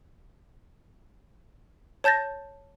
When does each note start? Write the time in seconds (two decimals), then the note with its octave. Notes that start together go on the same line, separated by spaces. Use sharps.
2.04 C#5 A5 G6 A6 A#6